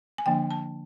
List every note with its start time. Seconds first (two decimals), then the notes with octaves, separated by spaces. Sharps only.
0.18 G#5
0.26 D3 F3 A#3 D4 G5
0.51 A5